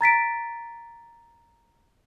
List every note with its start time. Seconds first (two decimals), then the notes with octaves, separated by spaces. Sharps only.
0.01 A#5 A6 B6 D7